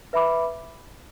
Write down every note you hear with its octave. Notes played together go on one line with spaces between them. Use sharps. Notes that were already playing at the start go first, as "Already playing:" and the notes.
B4 E5 B5 D6